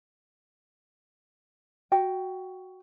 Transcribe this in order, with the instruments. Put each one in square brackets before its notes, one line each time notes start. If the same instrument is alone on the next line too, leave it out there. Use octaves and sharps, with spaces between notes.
[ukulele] F#4 G5